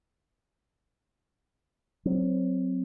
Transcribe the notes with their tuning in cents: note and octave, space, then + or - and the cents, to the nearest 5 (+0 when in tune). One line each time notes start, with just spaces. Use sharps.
F#3 +5 C4 +0